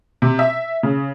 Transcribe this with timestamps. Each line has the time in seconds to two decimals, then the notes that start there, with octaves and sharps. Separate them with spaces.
0.22 C3
0.39 E5
0.83 C#3